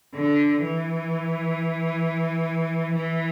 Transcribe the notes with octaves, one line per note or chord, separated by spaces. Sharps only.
D3
E3
E3